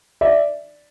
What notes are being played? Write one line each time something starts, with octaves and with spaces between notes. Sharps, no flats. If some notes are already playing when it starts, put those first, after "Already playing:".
D5 E5